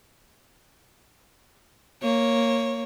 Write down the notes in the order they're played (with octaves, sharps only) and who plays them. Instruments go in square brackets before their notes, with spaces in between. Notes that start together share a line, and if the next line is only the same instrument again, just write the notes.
[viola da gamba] A#3 [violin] C#5